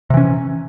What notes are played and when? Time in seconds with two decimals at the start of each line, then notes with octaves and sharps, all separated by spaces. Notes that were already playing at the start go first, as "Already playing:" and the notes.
0.10 C3
0.14 E3
0.17 C#4